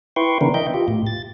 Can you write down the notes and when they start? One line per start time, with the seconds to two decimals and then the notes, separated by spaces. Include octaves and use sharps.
0.16 E4 B4 G5 C6 C#6
0.41 C#3 E3 B3 D4 A#4
0.54 D#5 E5 G5 G6
0.74 F4 G4
0.88 A2
1.07 A6